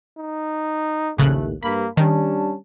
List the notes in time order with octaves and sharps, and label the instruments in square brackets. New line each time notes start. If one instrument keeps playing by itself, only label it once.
[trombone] D#4
[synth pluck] A#1 C#3 F#6 [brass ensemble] D#2 A2 [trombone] A3
[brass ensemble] G2 [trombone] A#3 [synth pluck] B5
[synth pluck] D#3 [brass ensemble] G3 D4 A5 [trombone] C#4